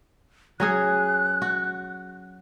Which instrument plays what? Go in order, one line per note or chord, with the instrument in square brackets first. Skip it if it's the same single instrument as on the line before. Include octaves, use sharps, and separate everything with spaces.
[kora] F#3 C#4 G#4 [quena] F#6
[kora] F#4